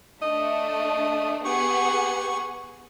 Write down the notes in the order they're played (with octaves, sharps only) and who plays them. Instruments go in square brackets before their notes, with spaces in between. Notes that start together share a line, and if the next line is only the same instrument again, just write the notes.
[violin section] A3 D4 [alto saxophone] D#5
[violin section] B3 G#4 F#5 [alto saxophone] G4 [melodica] C#6